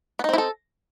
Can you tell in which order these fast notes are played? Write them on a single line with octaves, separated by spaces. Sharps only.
B3 D#4 C4 E4 A4